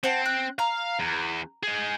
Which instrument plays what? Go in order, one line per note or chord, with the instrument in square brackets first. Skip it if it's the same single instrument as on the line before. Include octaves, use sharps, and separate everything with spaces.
[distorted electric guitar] C4 [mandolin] C5 F#5 A5
[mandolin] F#6
[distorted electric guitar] F5 [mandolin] A#5
[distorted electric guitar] E2
D#4 G#4